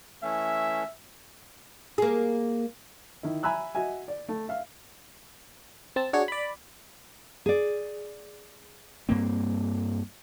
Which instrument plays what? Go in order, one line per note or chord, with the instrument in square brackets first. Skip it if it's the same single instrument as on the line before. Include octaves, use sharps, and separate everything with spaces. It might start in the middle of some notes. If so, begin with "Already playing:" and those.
[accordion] E3 A3 C#4 [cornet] E5
[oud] A#3 G#4
[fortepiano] D#3 E4
E5 G#5 A#5 B5 E6 F#6
F#4 D#5 E5 G#5
D5
A3
E5 F5
[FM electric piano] C4 A5
D4 F#4 G#4 C#5
D5 B5
[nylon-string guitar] G#4 D5
[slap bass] G2 A#3 C4